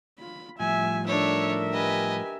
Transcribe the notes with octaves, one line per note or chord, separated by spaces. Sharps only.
F4 B5
A2 F3 G3 E5 G#5
D4 D#4 A4 A#4 C#5 E5
G4 B4 D#5 G#5